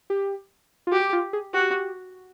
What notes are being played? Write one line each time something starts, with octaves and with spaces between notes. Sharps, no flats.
G4
F4
F#4 G4
F4
G#4
F#4 G4